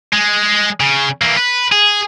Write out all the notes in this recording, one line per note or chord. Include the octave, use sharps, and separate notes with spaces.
G#3
C#3
E3 A#3
B4
G#4